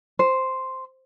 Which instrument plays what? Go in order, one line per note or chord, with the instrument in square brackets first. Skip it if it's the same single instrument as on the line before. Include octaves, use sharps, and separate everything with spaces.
[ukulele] C5